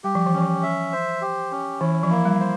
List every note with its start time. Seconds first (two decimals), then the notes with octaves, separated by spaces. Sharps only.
0.04 G3 G4
0.15 F3
0.26 E3
0.34 F3 C#4
0.63 E5
0.92 C5
1.21 G4
1.51 C#4
1.80 E3 E4
2.03 F3
2.10 A#3
2.25 G3
2.40 C5